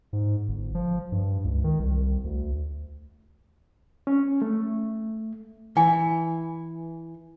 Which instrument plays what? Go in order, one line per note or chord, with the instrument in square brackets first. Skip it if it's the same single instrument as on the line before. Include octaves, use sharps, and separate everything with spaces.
[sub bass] G#2
G1
F3
G2
C#2
D#3
C2
D2
[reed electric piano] C#4
A3
[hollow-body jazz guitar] E3 [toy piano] G#5